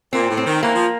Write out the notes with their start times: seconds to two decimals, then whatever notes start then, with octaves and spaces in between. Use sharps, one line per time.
0.13 A#2 C4
0.29 A2
0.37 C4
0.45 D#3
0.62 E3 A#3
0.74 F3